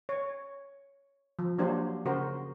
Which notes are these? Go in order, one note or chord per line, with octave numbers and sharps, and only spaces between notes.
C#5
F3
F#3 A#3 D4 G4 C5
C#3 F#4 A#4 C5